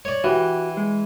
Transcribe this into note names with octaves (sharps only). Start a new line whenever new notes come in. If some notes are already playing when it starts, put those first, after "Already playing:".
C#5 D5
E3 F#4 G4
G#3